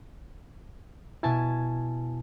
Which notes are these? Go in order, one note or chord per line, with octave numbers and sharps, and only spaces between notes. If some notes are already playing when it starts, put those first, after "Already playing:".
B2 E4 G#5 A5 G#6